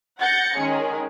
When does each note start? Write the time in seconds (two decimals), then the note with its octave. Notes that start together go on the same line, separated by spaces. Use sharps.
0.19 F#5 G6 A6 A#6 C#7
0.56 D#3 G#3 C#4 G#4